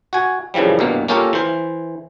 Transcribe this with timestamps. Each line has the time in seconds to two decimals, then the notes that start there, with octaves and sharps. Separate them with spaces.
0.13 F#4 G#5
0.54 F#2 C#3 E3 F3 G3
0.79 C2 G2 B2 A#3
1.08 A#3 C#4 F4 G4 A4 A#4
1.33 E3 C5